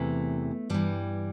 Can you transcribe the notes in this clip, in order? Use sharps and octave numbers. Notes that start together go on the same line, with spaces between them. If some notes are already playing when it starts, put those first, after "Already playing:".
Already playing: E2 C3 E3 A3
G2 E3 G3